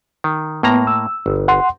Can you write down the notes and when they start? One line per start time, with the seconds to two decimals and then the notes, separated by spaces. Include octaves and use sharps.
0.24 D#3
0.63 A2 A#3 B3 A#5
0.87 E6
1.26 G1
1.48 F#5 C6